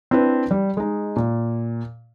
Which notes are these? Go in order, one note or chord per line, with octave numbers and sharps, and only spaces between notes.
C4 D4 E4 B4
G3
G#3 D#4
A#2